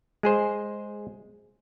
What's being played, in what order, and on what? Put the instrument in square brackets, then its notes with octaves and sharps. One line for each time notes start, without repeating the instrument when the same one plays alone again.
[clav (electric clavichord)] G#3 G#4 C5